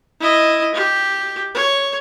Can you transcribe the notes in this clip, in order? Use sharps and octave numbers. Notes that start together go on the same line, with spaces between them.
E4 D#5
G4
C#5